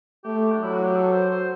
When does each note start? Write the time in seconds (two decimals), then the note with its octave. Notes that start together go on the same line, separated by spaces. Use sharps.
0.24 A3 G4
0.52 D4
0.60 F#3 E4
0.74 F#4
0.84 G4
0.96 A4
1.13 C5
1.30 C5